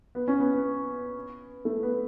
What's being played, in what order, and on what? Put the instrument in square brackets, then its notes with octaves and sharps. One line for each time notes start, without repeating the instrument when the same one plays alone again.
[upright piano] B3
C#4
B3
B3
A3
B3